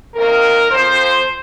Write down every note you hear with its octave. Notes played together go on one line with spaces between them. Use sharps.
C3 D#3 A#3 A#4
F2 F3 C4 C5